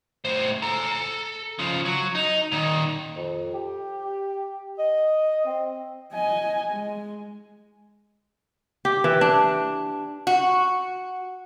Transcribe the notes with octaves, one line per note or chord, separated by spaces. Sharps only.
A2 C5
A4 A#5
C#3 F3
F#3
D#4
A#2 D#3
F2
G4
D#5
C4
D#5 G#5
G#3
G4
E3
D4
F#4